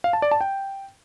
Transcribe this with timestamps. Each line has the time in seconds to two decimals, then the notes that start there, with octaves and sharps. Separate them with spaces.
0.04 F5
0.13 A5
0.22 D5
0.31 A5
0.41 G5